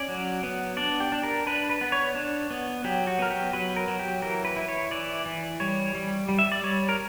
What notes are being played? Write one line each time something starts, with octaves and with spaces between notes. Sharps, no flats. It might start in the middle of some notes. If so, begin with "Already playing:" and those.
Already playing: C#4 D5
F#3
B3
D4 D5
G4
D4
A#4
D4 B4
B4
B3
C#5
D4
B3
F#3 G4
F#4
B3 A#4
G4
F#3 B4
A#4
F#3
G4
E3 A#4
B4
E4
C#5
E3 D5
E3
G3 C#5
G3
G3
E5
D5
G3 C#5
A#4